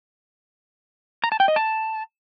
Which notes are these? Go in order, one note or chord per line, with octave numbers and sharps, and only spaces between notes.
A#5
A5
G5
D#5
A5